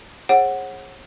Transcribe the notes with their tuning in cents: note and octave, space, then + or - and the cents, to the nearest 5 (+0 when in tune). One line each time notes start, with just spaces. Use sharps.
G#4 +0 C#5 -40 F#5 +0